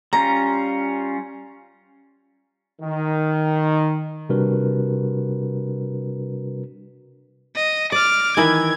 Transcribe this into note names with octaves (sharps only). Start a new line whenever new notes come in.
G3 C#4 F4 A#5
D#3
C3 G3 D4 F#4 A#4 B4
D#5
D5 D6 F6
D#3 E3 E4 G#6